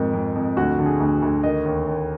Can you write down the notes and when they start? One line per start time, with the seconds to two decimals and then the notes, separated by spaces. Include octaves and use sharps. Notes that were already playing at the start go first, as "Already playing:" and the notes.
Already playing: F2 G#2 D#3
0.13 F2
0.36 F2
0.57 D2 F#4
0.79 D3
0.86 G#4
1.00 D2
1.22 D2
1.43 D#3 D#5
1.65 D#2
1.88 D#2